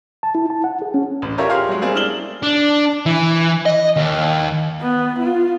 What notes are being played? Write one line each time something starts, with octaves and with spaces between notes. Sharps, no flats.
A5
E4
A5
F#5
G#4
C#4
A1
F4 G4 A#4 C#5 D5 E5
G4 G#4 A#4 F5 C6 F6
F#3 G#3
G3 G#3 A#3 C4 G#4
D4 E4 F6 E7 F#7 G7
D4
E3
D#5
D#2
B3
F4